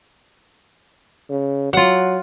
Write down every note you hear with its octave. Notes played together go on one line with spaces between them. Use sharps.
C#3
F#3 F4 F#5